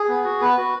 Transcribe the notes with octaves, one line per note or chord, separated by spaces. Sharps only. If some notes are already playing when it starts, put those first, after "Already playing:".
Already playing: G#4
B3
F#4
B3 B4
F#4